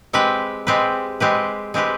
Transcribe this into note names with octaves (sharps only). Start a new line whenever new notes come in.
G#3 C4 G4 B4
G#3 C4 G4 B4
G#3 C4 G4 B4
G#3 C4 G4 B4